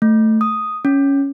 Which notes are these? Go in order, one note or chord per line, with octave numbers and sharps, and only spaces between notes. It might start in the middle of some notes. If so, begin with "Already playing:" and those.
A3
D#6
C#4